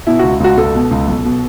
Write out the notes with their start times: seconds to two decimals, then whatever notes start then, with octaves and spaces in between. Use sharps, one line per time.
0.06 B2 E4
0.19 C#2 F#4
0.40 C#2 F#4
0.57 C#2 A4
0.75 B2
0.91 C#2
1.08 B1
1.25 B2